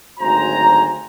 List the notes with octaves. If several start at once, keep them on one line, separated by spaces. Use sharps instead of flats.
G#1 D2 F#3 C5 G#5 A#5